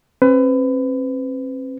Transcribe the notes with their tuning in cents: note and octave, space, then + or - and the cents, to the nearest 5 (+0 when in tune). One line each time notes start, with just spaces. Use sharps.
C4 +40 B4 +30